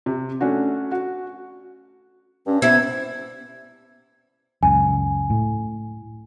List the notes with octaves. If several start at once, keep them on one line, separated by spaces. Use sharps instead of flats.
C3
A3 C#4 D4 F#4
F#4
G2 C#4
C3 B3 E4 G#6
C#2 F#2 G#5
A2